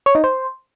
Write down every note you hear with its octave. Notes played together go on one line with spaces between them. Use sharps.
C#5
D#4
C5